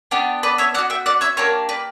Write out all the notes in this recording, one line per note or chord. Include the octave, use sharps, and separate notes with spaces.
B3 D4 G4
B4 D5
C#5 E5
B3 F#4 D5 F#5
E5 G5
D5 F#5
C#5 E5
A#3 D4 G4 A#4 C#5
B4 D5